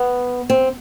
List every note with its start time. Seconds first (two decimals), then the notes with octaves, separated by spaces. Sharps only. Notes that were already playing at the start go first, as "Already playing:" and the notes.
Already playing: B3
0.50 C4